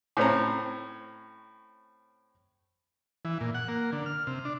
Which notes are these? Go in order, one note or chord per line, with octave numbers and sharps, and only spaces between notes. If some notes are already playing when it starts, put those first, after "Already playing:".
A2 C4 C#4 A#5
E3
A#2
F#5
A#3
D3
F6
C3
D4